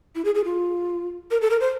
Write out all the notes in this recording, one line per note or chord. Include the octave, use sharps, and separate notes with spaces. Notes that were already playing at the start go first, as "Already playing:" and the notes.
E4
G#4
G#4
F4
A#4
A4
A#4
C5